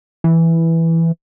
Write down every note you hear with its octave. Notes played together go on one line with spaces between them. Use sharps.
E3